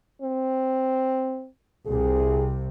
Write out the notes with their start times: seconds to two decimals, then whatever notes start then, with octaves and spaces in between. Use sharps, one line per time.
0.22 C4
1.86 C2 C3 G#4